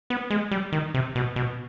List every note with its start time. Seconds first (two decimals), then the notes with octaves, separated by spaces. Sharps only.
0.10 B3
0.30 G#3
0.51 G3
0.73 D#3
0.94 C3
1.16 B2
1.36 B2